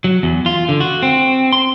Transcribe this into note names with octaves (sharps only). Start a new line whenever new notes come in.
F#3
E2
F4
D3
F#4
C4
C6